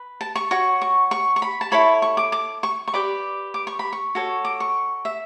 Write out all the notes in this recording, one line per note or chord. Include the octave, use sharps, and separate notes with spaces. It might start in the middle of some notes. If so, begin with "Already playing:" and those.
Already playing: B4
A5
C#6
F#4 C#5 C#6
C#6
C#6
C#6
B5
A5
E4 A4 C#5 B5
C#6
D6
D6
C#6
C#6
G4 B4 D5 D6
D6
C#6
B5
C#6
F#4 A4 C#5
D6
C#6
E5